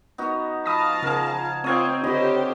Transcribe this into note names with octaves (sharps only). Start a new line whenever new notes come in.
B3 D#4 F#4
F3 F5 A5 B5 D#6 A#6
C#3 G#4 A#4
C4 F4 C#5 F5 G5 D#6 G#6
D3 C4 G4 C5 C#5 D#5 B5